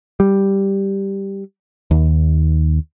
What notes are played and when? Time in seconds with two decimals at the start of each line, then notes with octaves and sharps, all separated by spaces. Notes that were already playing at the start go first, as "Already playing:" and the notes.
0.20 G3
1.91 D#2